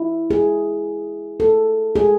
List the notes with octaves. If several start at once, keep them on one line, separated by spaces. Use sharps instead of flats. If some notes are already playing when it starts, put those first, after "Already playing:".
Already playing: E4
G#4
A4
G#4